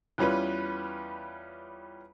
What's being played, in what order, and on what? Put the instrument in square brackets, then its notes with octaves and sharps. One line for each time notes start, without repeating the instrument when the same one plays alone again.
[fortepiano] E2 G3 C#4 F4 B4